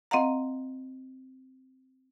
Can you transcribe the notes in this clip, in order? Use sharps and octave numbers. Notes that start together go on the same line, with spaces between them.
C4 D#5 F5 F#5 A#5